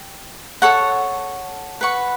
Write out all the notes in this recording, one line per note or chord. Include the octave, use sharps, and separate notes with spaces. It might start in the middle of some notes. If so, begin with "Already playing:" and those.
Already playing: G5
A4 C#5 F#5 A5
B4 F#5 C#6